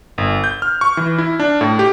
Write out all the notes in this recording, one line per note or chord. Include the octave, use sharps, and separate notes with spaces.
G1
G6
F6
C#6
E3
E4
D4
A2
G4